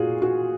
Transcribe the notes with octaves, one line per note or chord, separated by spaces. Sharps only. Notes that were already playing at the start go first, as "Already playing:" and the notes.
Already playing: A#2 F4 F#4 G#4
F#4